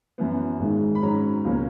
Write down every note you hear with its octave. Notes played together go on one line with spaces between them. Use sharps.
F#2 E3 B3
G#1 G#2 D#3 G#3
B5
G#2 F#3 C#4 A#5
C#2 B2 F#3 A#3 C#4